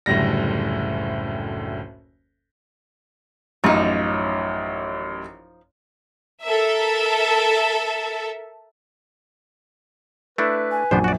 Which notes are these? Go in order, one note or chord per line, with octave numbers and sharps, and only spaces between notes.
F#1 D2 A2 G3 A#6
A1 F#2 F3 D#4
A4 A#4 E5
A3 D4 E4 B4
G#5
A#1 F#2 B3 D4 C5
F#4 D5